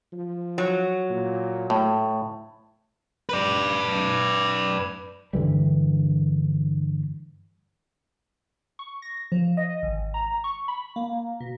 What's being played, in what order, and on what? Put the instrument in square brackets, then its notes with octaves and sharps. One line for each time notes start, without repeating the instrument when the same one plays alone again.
[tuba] F3
[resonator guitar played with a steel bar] F#3
[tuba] A#2
[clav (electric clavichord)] A2 [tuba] A3
[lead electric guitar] B4 D5
[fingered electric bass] G2 D3 E3 G3
[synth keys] C#6
A#6
F3
D#5
G#1
A#5
C#6
B5
A#3
B2